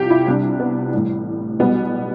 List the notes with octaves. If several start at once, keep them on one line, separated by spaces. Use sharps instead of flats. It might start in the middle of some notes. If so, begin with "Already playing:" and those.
Already playing: C2 C3 F3 F4 G4
E4
C2 C3 G3 D4
B3
A1 A2 G3
B1 B2 G3 B3